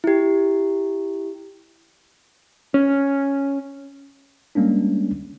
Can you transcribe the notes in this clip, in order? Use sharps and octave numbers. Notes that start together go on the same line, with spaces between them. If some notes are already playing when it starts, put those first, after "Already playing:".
E4 G4
C#4
G3 G#3 A#3 C#4 D4